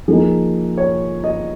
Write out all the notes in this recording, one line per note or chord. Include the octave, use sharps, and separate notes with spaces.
F3 A#3 D#4 G#4
C#5
D#5